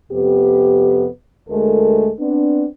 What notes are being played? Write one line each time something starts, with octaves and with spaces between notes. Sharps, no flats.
F2 C3 B3 G4
D2 G#3 A3 A4 A#4
B3 C4 D4